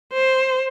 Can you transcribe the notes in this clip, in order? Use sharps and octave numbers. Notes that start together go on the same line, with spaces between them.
C5